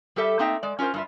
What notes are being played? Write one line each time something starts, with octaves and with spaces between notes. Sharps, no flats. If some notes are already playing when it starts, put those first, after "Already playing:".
G3 G4 A4 E5
A3 A#3 C4 D#4 E5 G5
G#3 D5
C#4 F4 A4 A#4 C5
G2 F4 E5